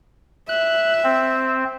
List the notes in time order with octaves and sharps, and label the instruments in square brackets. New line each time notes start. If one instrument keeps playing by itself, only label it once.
[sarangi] E5 [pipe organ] F#6
[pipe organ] C4